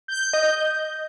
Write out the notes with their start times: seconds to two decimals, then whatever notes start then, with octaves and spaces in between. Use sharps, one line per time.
0.08 G6
0.33 D#5